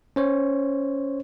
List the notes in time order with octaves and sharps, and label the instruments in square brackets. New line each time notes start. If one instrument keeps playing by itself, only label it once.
[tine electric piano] C#4 C5 C#5